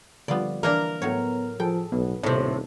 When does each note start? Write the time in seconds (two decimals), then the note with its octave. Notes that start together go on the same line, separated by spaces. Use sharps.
0.28 D3 F3 G3 B3 F4 D5
0.63 E3 A#3 D4 A#4
1.02 A2 F#3 B3 C#5
1.60 F3 G#4 A4 G5
1.92 B1 B3
2.24 D#1 A2 C3 B3 D#4 A4